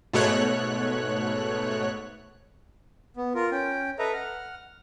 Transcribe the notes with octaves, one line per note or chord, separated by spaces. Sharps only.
G#2 B2 A3 C#5 F#6
B3
F4 A#4
C#4 G5
A4 B4 D#5 E5 A#5
F#5 F6